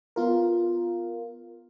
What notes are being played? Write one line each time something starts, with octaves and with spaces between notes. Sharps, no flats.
B3 F4 A#4